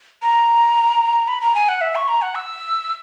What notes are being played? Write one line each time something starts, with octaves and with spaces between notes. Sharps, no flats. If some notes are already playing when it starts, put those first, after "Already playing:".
A#5
B5
A#5
G#5
F#5
E5
C#6
A#5
F#5
E6